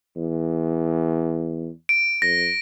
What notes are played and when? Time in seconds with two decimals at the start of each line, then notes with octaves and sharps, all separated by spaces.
0.16 E2
1.89 D7
2.22 F2 A#6